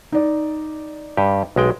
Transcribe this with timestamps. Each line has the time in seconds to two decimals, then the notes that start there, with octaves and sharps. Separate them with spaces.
0.12 D#4 D5
1.17 G2 G4
1.56 B1 G#3 G5